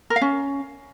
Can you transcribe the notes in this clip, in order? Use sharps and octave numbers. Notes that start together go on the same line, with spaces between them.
A#4
F5
C#4